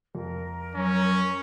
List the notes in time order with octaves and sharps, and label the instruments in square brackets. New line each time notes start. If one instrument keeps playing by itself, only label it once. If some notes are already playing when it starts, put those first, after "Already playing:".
[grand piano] F2 [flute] A#4
[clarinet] F#3 [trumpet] C#4